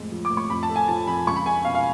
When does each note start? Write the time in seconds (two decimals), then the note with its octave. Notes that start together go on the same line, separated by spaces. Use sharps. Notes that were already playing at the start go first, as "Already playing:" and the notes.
Already playing: F2 A2 G#3
0.12 F3
0.25 D6
0.31 A2
0.37 C#6
0.49 F2 B5
0.63 A5
0.69 A3
0.76 G#5
0.88 F3 A5
1.07 F2 B5
1.27 C#2 C#6
1.36 B5
1.46 G#3 G#5
1.65 B2 F5
1.75 F5